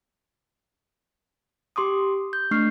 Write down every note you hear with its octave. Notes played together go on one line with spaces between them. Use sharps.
G4 C6 D6 D#6
G6
A3 D4 C#6 F6 G6 C7